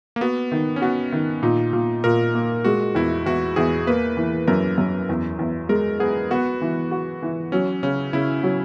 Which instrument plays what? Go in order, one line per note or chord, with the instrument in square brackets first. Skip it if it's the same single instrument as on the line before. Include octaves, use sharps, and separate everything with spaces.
[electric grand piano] A#3
[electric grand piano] B3 [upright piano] F#4
[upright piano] D#3
[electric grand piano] C#4
[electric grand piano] B3 [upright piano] F#4
[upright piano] D#3
[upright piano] A#2 [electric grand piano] D#4
[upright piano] A#2
[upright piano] A#2 [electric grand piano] A#4
[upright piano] A#3
[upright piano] G#3 [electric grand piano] F#4
[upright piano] E2 [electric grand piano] E4
[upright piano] E2 [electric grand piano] F#4
[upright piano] E2 [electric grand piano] G#4
[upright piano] A#3 [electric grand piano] B4
[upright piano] E3
[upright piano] F#2 [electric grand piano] A#4
[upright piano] F#2
E2
E2
[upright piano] G#3 [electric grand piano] A#4
[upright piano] B3 [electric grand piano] G#4
[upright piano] B3 [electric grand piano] F#4
[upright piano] E3
F#4
E3
[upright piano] F#3 [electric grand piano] C#4
[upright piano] C#3 [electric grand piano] C#4
[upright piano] C#3 [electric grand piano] E4
[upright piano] F#3